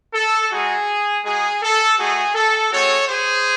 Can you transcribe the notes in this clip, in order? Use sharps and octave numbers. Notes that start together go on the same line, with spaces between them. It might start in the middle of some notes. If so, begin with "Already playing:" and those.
A4
G#3 D#4 F#4 G#4
G#3 D#4 F#4 G#4
A4
A3 D#4 F#4 G#4
A4
G#3 C4 F#4 A4 C#5
G#4 C5